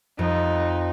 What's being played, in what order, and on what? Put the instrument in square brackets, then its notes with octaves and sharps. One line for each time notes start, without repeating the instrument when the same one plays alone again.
[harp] F2 [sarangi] D#4